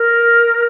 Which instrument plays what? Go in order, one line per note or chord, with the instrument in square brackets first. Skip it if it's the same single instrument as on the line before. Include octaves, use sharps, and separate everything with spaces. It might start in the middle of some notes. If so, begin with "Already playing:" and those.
Already playing: [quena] A#4